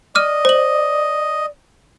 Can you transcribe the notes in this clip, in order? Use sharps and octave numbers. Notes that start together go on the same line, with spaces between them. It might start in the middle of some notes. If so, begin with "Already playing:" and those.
D5 D#5 D6 F6 D#7
C5 F#7